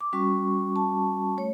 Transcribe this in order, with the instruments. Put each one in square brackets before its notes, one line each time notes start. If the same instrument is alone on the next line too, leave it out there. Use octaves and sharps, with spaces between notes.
[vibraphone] D6
G3 C#4 F#4 C#6
A5
A3 C#5